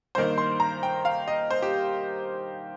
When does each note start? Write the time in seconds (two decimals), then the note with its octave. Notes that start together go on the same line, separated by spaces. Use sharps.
0.15 G2 D#3 A#3 C5
0.38 C6
0.60 A#5
0.83 G5
1.05 F5
1.28 D#5
1.50 C5
1.62 G4